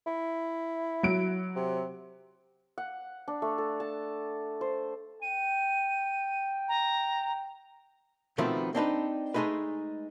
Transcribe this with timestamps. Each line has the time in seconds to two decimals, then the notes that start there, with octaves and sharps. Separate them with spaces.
0.07 E4
1.03 F#3 D7
1.56 C3
2.78 F#5
3.28 D4
3.42 A3
3.58 A4
3.80 A5
4.61 C5
5.22 G5 D#7
6.68 A#5
8.38 B2 D#3 F3 A3 B3 C4
8.75 C4 D4 D#4 B4
9.34 G#3 A3 D#4 G#4 B4